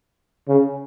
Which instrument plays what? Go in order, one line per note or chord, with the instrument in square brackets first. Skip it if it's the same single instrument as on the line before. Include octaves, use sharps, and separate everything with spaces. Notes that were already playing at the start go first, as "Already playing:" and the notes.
[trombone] C#3